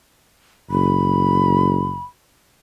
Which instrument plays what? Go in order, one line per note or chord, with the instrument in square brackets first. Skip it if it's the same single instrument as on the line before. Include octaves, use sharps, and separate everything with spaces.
[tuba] F#1 [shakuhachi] B5